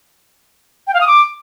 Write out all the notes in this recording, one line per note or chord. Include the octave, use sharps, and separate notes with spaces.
G5
F5
D#6
D6